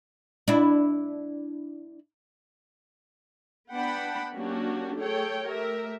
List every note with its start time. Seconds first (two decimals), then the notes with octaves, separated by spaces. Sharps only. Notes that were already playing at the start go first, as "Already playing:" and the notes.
0.48 D4 E4
3.71 B3 D4 F#5 G5 A5 B5
4.36 F#3 A#3 C#4 D4 F#4 G4
4.97 A3 G#4 A4 C#5 G5
5.45 A3 G4 A#4 E5